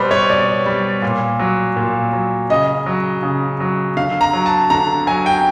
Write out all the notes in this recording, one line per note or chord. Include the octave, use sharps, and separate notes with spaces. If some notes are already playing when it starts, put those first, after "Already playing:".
Already playing: B2 G3 B4 C5
C#5
B2 D5
G3
A#2
F#3
A#2
F#3
C#3 D#5
F#3
C#3
F#3
D3 F5
A#5
F#3
A5
D3 A#5
F#3 G#5
G5